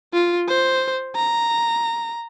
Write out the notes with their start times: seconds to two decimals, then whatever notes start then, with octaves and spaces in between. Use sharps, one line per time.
0.14 F4
0.49 C5
1.16 A#5